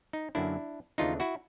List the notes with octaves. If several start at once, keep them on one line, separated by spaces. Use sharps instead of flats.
D#4
F#2 D3 F#3 A#3 D4 E4
D#2 C#3 E3 A3 D4 D#4 F4
E4 F#4